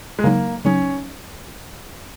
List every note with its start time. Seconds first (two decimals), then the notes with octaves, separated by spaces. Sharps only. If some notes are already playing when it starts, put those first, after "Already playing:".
0.19 G#3
0.24 C#3 F#3 A#3 D#4
0.65 C#3 F#3 C#4 D#4